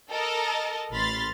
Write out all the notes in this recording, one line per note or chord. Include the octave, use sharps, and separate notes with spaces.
A4 A#4 D#5 A5
A1 B5 C6 F6 A6